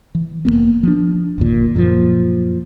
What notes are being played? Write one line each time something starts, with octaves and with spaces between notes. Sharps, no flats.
E3
F1 F#2 A#3 B3
F3 D4
G1 D#2 A#2
F#2 A#2 D#3 F3